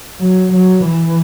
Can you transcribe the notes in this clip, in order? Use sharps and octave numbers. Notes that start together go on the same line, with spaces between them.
F#3
F#3
E3